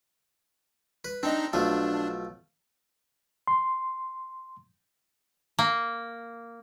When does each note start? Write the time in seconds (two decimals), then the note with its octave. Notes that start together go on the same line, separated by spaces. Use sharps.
1.05 B4
1.23 C4 D4 D#4 D#5
1.53 B1 F3 A3 D4
3.47 C6
5.59 A#3